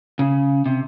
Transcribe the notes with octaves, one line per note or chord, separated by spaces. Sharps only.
C#3
C3